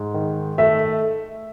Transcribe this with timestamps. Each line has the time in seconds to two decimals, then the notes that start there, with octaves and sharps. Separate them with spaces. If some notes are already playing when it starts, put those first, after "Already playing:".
Already playing: G#2
0.14 D#3
0.58 A3 E5